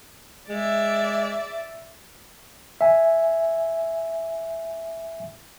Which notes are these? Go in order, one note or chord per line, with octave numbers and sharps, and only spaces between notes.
G#3 D5 E5
E5 G#5